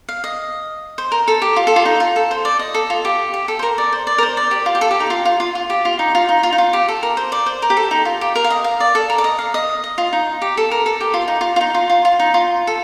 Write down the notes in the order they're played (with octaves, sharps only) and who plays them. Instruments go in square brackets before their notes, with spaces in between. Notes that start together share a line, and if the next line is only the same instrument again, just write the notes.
[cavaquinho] F5
D#5
C5
A#4
A4
G4
F4
A4
F4
D#4
F4
A4
C5
D5
D#5
A4
F4
G4
G4
A4
C5
A#4
D5
C5
D5
A#4
C5
D5
G4
F4
G4
A4
G4
D#4
F4
F4
F4
F4
G4
F4
D#4
F4
D#4
F4
D#4
F4
G4
A4
A#4
C5
D5
C5
A#4
G4
A4
D#4
F4
G4
A#4
F5
D#5
F5
D5
A4
A#4
D5
D#5
F5
D#5
D#5
F4
D#4
G4
A4
A#4
A4
G4
F4
D#4
F4
F4
D#4
F4
F4
F4
D#4
F4
A4